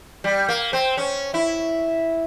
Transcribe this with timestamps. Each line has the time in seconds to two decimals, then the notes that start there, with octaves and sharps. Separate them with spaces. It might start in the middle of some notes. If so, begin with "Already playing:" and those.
0.24 G3
0.49 A#3
0.73 C4
0.97 C#4
1.34 E4